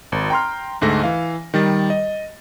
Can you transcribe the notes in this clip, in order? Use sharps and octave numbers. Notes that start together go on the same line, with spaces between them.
G#1
G5 A#5 C6 F6
D2 G#2 A3 A#6
E3 F5
D#3 G3 A6
D#5